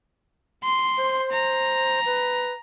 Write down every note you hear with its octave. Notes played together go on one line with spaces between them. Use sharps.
C6
C5
A#5
B4